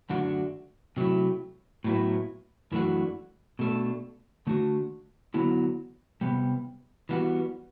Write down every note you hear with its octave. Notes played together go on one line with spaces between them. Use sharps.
F#2 D3 A3 D4 F#4
C3 F#3 A3 E4
A2 F#3 B3 E4
F#2 E3 A3 D4 F#4
B2 A3 D4
D3 A3 D4 F#4
D3 F#3 B3 E4
C3 G3 B3
E3 G3 B3 F#4